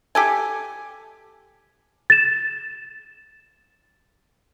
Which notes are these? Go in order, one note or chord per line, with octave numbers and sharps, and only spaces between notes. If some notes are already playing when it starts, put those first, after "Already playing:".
G4 A4 G#5
A6 E7